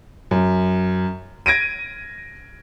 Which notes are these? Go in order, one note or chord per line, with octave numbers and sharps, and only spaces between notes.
F#2
G#6 A#6 D7 D#7